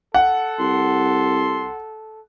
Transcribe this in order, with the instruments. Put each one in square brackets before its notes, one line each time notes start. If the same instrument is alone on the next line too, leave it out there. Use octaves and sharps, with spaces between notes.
[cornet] A4 [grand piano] F#5
[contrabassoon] C2 [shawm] C6